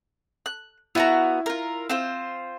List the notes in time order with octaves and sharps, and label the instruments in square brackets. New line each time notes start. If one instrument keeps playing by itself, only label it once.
[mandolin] F#6
[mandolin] B3 F#4 A#5 [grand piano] E4
[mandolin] F4 A#4
C4 F4 C5